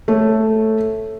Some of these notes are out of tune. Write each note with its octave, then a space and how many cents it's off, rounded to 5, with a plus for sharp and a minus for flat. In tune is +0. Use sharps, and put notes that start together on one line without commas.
A3 +0 C#5 -10